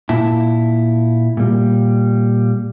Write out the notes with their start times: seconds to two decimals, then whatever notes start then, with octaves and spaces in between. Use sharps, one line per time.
0.09 A#2 E4 A5
1.37 A#2 G3